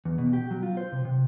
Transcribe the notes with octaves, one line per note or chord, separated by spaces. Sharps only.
E2
B2
G4
F#3
F4
C5
C3
C3